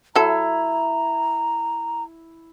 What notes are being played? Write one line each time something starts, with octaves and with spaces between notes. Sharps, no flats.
F#3 E4 A4 A#5